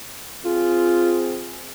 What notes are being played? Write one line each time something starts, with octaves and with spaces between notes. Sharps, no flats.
C4 F4 G#4